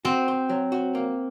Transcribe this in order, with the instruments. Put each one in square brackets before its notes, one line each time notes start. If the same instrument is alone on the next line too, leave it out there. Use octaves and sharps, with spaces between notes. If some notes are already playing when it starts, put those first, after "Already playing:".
[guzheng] C4 [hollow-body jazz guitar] F#4
[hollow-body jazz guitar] C5
F#3
F#4
A#3